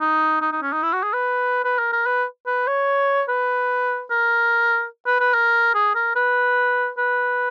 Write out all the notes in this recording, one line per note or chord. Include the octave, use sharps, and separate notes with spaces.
D#4
D#4
D#4
C#4
D#4
E4
F#4
G#4
B4
B4
A#4
A#4
B4
B4
C#5
B4
A#4
B4
B4
A#4
G#4
A#4
B4
B4